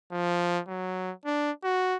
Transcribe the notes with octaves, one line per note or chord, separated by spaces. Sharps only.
F3
F#3
D4
F#4